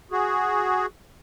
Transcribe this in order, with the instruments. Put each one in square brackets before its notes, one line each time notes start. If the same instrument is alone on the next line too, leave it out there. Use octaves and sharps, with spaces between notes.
[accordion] F#4 G#4